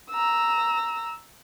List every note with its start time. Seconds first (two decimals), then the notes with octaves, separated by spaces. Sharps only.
0.11 A#5 E6